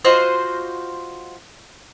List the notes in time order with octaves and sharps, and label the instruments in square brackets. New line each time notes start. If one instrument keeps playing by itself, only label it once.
[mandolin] F4 F#4 C5 D#5